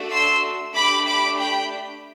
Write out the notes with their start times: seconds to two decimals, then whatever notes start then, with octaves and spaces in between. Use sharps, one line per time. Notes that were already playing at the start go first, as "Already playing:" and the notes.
Already playing: A3 D4 F#4 A4
0.12 C6 E6
0.75 A3 D4 G4 B5 D6
1.07 B5 D6
1.38 G5 B5